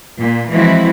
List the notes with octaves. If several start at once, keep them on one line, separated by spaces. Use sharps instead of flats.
A#2
E3 F3 G#3 C4 E4 F#4